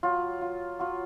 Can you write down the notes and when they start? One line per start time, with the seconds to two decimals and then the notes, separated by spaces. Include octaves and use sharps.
0.03 F#3 F4
0.41 F4
0.79 F#3 F4